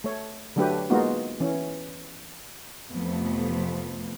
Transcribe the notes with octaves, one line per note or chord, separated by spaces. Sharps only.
A3 C#5
D3 F#3 A3 D4 G4 B4
G#3 A#3 B3 D#4 F4 F#4
E3 C#4
F2 C3 E3 F3 A3 B3